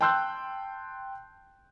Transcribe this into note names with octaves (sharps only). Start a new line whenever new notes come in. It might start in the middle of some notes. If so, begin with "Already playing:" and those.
G5 A5 C6 E6 F#6 G6